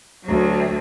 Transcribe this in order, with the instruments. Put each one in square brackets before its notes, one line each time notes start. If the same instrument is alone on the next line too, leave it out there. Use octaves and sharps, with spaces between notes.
[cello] D2 F#3